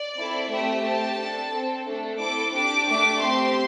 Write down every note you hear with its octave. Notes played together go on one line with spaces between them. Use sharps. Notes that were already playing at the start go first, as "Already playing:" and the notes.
Already playing: D5
C4 E4 A4
A3 C4 G4 E5
C4 G4 A5
D4 A4
C4 A4
A3 D4 A4
C4 E4 A4 D6
D4 G4 D6
A3 D4 G4 D6
C4 G4 C6